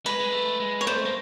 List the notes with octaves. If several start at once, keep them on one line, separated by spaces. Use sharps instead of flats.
G#3 B4
G#3
A3
G#3
C#5
A3 C5
A#3